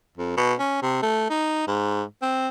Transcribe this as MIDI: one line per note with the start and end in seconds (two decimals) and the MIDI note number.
0.18 0.35 41
0.37 0.54 47
0.59 0.79 61
0.82 1.02 48
1.03 1.28 57
1.30 1.66 63
1.68 2.04 44
2.22 2.49 60